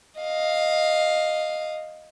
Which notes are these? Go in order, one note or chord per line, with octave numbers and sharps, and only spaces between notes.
D#5 F5